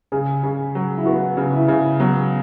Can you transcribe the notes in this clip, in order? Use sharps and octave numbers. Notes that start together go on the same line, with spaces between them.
C#3 G#4
C#3
F#3
E4
B3 F#4
C#3
E4
C#3
F#3 B3